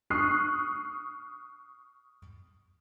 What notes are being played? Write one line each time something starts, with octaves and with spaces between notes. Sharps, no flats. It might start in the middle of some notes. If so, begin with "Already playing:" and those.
C#6 D#6 F6 F#6 C7